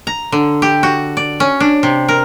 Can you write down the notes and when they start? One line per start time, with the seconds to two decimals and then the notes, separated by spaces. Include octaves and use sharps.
0.07 A#5
0.32 D3
0.62 G4
0.83 F#4
1.17 D5
1.40 C#4
1.60 D4
1.83 C3
2.08 A#4